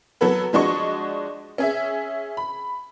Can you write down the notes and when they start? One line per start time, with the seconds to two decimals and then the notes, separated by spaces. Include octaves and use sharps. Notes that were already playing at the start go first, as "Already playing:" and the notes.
0.21 F#3 B3 F#4 A4 B4
0.53 F3 G#3 D4 F#4 D#5 C#6
1.58 C#4 G#4 E5
2.37 B5